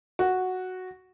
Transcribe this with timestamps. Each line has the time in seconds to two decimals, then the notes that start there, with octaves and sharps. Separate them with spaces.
0.19 F#4